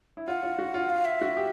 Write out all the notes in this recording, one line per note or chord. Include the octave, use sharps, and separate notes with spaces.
E4
F4 F#5
F4
F#4
F4
F5
E5
F#4
G4